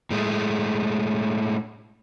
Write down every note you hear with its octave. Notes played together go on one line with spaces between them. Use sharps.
A2 G#3 A3